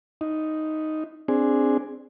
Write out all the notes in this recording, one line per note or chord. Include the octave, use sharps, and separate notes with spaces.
D#4
C4 D4 G#4